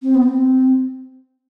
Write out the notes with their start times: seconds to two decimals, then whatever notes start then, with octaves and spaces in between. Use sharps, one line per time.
0.02 C4
0.14 B3
0.26 C4